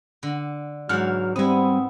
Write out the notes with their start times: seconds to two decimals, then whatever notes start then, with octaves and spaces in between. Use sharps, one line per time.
0.23 D3
0.89 G#2 E3 F#3 F#5 F6
1.36 G3 B3 C4 E4 D#6